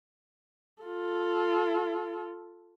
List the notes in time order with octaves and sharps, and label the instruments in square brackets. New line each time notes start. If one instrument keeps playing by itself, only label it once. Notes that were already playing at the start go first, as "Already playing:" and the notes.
[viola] F4 A4